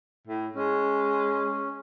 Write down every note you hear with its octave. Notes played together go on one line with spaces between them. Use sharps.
A2
G#3 C#4